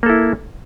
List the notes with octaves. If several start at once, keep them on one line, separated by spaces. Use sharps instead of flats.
A#3 E4 A4